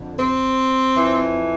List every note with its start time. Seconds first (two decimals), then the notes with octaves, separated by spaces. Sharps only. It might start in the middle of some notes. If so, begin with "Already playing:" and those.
Already playing: F2 D3
0.17 C4
0.95 F2 E3